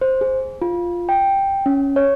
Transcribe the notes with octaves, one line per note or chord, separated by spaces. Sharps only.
C5
G#4
F4
G5
C#4
C#5